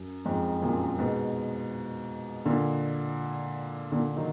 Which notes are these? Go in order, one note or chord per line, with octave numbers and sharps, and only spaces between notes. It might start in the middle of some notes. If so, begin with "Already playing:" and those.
Already playing: F#2
F2 G#2
F#2 A#2
G#2 B2
A#2 D3
A#2 D3
D#3 F#3